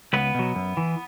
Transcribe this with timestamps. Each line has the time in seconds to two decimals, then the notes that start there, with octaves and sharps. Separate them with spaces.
0.13 C#2 B3 B4
0.35 B2 F#3
0.55 F#2
0.77 E3